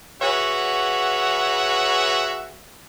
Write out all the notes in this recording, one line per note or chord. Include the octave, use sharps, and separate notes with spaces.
F#4 G#4 B4 C#5 E5 F#5